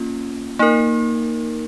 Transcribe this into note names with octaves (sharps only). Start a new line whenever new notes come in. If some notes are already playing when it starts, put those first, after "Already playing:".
Already playing: A#3 C#4 F4
A#3 D#4 A#4